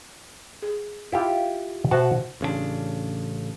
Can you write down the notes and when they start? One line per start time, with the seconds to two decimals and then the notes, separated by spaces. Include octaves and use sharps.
0.62 G#4
1.12 E4 F4 G4
1.91 B2 F#4 C5 E5 A5
2.41 A1 C#3 E3 D4